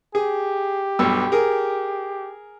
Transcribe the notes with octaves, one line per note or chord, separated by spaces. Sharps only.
G4 G#4
B1 G2 E6
G#4 A#4